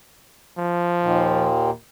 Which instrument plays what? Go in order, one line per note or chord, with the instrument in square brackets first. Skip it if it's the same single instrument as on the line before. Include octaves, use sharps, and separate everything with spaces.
[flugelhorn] F3
[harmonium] D#2 A#2 D#3